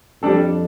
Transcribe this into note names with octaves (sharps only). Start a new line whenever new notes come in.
F2 G3 D4 A4